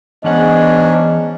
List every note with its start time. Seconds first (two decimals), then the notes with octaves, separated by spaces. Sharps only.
0.24 G#2 E3 B3 C#4 D4 D#5 F#5